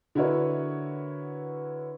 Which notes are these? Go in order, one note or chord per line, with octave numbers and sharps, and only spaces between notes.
D3 E4 F#4 A#4 B4 C#5